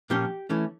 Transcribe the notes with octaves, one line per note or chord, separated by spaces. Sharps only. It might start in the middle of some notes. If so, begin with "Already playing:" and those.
A#2 F3 A#3 C#4 G4 G5
E3 A3 C#4